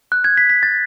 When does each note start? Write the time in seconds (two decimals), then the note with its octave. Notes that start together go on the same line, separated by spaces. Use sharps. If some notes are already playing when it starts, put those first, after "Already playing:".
0.12 F#6
0.24 G#6
0.37 B6
0.50 B6
0.63 A6